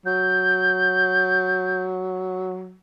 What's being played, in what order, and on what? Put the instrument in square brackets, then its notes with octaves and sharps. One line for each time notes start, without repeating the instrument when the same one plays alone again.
[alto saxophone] F#3 [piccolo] G6